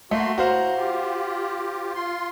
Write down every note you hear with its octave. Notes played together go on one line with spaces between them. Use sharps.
A3 A#3 F#4 C6
A2 F#4 C5 F5 A#5
F4 G4
F4 C6